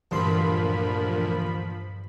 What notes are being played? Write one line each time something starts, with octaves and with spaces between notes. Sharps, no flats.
D2 G2 A#2 E3 F3 G4 B5 C6